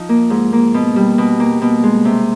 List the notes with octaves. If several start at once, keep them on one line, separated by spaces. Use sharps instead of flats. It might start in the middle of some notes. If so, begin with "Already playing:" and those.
Already playing: F3 D#4
A#3
G#2
A#3
B2
G3
B2
A#3
B2
G#3
C3